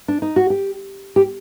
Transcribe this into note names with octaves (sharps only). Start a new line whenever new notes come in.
D4
D#4
F#4
G4
G4